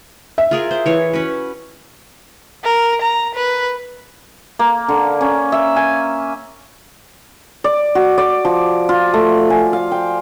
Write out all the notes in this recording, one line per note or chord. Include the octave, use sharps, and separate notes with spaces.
E5
F4 G#4 A#4
C5
E3 C#5
C#4 F#4 B4
A#4
A#5
B4
A#3
D3
C#4
E5
G#5
D5
F#4
D5
F3
F4
A3
G#5
F5
G5